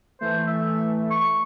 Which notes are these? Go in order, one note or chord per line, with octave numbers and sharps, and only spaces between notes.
E3 A3 C5
E5
C#6